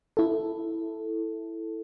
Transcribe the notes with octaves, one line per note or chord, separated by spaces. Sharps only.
E4 A4